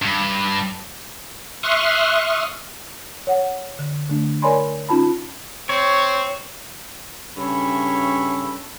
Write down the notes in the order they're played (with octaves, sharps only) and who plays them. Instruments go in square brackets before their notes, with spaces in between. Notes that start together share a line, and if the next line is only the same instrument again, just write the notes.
[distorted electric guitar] G2
[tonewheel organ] E5 C6 C#6 D#6 F6 F#6
[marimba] C#5 F#5
D3
D3 A3 D4
A#4 C#5 D5 G#5 B5 C6
C#4 D#4 F4 A5 B5
[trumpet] C4 [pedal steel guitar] C#5
[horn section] G2 C#3 C#4 A4 C#5 B5